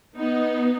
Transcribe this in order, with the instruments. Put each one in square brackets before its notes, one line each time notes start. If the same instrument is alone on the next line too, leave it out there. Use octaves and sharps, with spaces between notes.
[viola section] B3 D#4